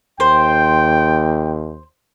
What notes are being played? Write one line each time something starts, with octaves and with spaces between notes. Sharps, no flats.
D#2 C5 G5